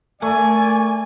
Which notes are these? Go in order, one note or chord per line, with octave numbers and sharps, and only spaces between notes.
A3 A#4 D5 G#5